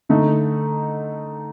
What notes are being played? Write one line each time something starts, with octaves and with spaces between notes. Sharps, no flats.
D3 A3 D#4